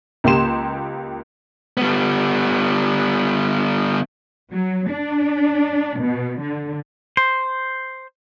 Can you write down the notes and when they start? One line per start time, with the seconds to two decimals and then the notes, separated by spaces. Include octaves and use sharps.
0.24 C#2 A#3 G4 C6 E7
1.77 G3 B3
4.51 F#3
4.89 D4
5.99 B2
6.41 D3
7.17 C5